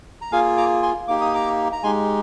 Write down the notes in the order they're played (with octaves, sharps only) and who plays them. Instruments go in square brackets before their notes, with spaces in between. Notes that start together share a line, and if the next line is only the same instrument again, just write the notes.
[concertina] A#5
A#3 F4 G#4 F5 G#5
A#5 D6
G#5 C6
A#3 D#4 G4 D6
D#6
A#5 D6
A#5
G#3 D#4 G4 G#5 C6